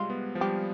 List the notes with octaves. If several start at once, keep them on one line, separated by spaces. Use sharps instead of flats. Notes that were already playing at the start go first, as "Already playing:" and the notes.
Already playing: C3 G3 G#3 F4
B3
F3
G3 G4